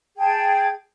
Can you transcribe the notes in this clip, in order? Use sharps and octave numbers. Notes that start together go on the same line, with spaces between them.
G#4 G5 A5 G#6